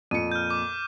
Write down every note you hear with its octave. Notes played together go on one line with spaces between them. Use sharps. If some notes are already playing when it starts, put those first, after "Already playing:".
F2 A#2 C#7 D#7
F6 G6
D6